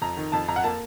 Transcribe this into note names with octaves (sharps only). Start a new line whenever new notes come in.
F2 A#5
D#3
F2 A5
F2 A#5
F#5
A#3 A5